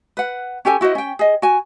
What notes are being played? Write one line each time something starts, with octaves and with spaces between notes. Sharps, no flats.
B4 F#5
C#4 G4 A4 G#5
E4 F#4 C5 D#5
C#4 G5
G#4 D#5
F#4 G#5